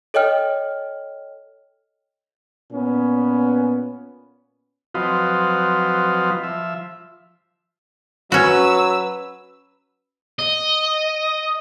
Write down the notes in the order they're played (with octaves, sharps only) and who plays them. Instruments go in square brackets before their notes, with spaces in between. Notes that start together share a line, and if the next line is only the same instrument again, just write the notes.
[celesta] A4 C#5 D#5 G5 F6
[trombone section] A#2 B3 C#4
[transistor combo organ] F3 F#3 C4 F4 B4 D#5
F3 E5
[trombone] F#3 [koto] C#4 F#4 [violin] B4 E6
[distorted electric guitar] D#5